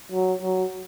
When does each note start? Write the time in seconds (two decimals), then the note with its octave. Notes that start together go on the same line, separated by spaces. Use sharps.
0.12 F#3
0.42 F#3